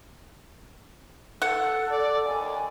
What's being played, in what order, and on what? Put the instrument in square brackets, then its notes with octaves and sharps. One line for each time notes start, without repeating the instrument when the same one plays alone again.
[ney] A4 [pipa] F#5
[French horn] D5
[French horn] D#2 [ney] G#5